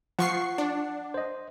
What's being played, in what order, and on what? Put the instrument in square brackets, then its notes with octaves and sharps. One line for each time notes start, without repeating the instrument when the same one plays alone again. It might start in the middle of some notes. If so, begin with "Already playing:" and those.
[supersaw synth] F3 C#6 C7 [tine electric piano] F#5
[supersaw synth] D4
[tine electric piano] C5 D#5